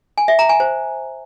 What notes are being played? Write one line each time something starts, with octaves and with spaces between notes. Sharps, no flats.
G#5
E5
A#5
G#5
C5